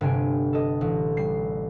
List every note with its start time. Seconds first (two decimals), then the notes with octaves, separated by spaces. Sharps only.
0.01 G1 C3 G#5 D7
0.53 A4 D#5
0.81 A1
1.17 G3 C7